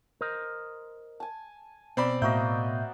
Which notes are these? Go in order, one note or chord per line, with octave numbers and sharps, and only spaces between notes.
A#4 C5 D#5
G#5 A5
B2 C4 D5 B5
A2 A#3 F#4 D#5 E5 G6